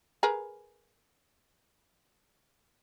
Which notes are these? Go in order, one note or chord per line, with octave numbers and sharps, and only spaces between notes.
G#4 A#4 B4